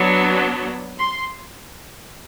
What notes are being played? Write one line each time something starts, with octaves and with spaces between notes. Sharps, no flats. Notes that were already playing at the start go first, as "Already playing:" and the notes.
Already playing: F#3 B3 D4
C6